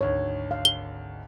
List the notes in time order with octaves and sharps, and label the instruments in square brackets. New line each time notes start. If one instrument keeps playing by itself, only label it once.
[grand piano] G#1 D2 D#4 [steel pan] C#5
[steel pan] F5
[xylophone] G7